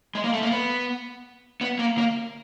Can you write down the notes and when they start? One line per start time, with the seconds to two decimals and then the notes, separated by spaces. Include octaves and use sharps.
0.15 G#3
0.24 A#3
0.33 A3
0.42 A#3
0.52 B3
1.61 B3
1.79 A#3
1.98 A#3